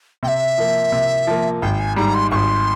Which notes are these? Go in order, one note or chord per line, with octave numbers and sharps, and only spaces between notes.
C3 G5
E5
F3 A#3
C3
F3 A#3
G#1 G5
G#5
G#2 G3 A#5
C6
G#1 C6 C#6